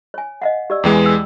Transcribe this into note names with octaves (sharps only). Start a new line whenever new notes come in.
C#5 G#5
D#5 F5 F#5
G4 D5 E6
E2 E3 G#3 G5 D6
E6